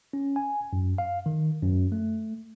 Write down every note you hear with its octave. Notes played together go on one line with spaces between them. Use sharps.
C#4
G#5
F#2
F5
D#3
F#2
A3